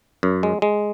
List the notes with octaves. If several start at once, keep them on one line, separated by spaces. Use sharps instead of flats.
F#2
G#3
G#3